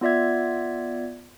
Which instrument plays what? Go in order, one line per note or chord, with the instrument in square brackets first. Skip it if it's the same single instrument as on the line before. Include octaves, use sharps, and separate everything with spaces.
[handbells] B3 F4 D5 E5 G#6